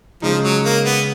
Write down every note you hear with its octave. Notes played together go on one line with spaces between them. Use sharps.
C#3 F3 G#3 D#4
F#3
A#3
B3